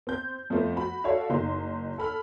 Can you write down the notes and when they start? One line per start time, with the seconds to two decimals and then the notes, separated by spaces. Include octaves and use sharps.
0.07 C4 G6
0.50 F2 F3 A3 C4
0.76 F#4 B5
1.04 F#4 A4 C#5 D5 E5 F5
1.30 F#1 D#4 C6
1.98 A4 B5 F6